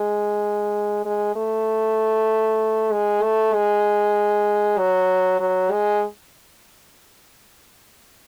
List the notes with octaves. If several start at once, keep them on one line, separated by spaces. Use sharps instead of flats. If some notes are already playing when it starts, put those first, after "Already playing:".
Already playing: G#3
G#3
A3
G#3
A3
G#3
F#3
F#3
G#3